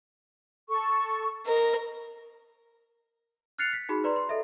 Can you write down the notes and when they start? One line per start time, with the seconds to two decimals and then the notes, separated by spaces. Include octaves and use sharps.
0.69 A4 C#6
1.46 A#4 D#5
3.58 F6 F#6 A6 C7 C#7 F7
3.73 B6
3.89 D#4 F#4 G#4 B5
4.04 B4 D5 A#5 C6
4.16 C6
4.29 A4 D#5 E5